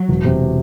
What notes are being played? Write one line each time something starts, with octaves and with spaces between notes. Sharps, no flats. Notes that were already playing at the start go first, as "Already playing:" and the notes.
Already playing: F#3
E1
C3